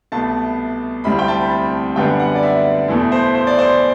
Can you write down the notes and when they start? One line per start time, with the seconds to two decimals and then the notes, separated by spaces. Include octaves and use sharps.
0.12 C2 B2 A3 A5
1.04 D2 C3 G3 C4 E4 B5
1.19 G5
1.28 A5
1.41 B5
1.50 A5
1.96 F#2 D3 G3 B3 G5
2.19 F#5
2.35 D5
2.43 E5
2.88 E2 B2 A3
3.12 C5
3.35 C5
3.47 D5
3.58 C5